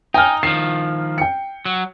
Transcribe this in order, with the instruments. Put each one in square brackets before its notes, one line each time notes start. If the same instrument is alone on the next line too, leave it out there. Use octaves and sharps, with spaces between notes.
[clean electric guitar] D#4 [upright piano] G5 G#5 F6
[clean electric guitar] D#3 F3 [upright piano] C7
[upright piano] G5 C#7
[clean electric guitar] F#3